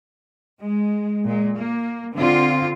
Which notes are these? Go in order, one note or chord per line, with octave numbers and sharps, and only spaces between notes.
G#3
A#2 G#3
A#3
D3 C4 F4